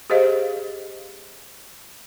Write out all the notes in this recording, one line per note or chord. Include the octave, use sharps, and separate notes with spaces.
G4 G#4 C5 D#5 F5